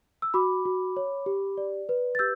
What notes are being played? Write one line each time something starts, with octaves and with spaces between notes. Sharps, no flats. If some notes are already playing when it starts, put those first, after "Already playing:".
E6
F#4 B5 D6
F#4
C#5
G4
D5
B4
A6
G4 E6 G6